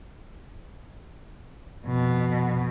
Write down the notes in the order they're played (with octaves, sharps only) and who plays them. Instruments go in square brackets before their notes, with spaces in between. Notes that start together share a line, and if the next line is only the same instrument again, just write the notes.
[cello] F2 B2